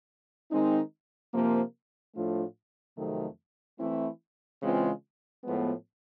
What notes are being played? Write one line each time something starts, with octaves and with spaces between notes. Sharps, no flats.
D#3 G#3 C4 D#4
C3 F3 A#3
A2 F3 A3 D4 F4
F2 C3 D#3 F#3 A3
E3 A3 C4 E4
C#3 E3 G#3 C4 F4
A2 F3 G#3 B3